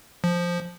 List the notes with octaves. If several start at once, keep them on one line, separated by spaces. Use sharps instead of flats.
F3